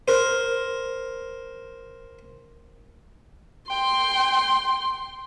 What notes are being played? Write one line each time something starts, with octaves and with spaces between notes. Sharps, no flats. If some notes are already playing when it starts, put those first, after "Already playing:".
A#4 C5
G5 C6